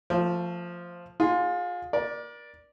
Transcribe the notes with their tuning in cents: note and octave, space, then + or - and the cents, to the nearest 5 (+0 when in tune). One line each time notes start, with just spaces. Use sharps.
F3 +0 A3 +30
F4 +30 G#4 +0 C6 +0
A#4 +40 D5 +0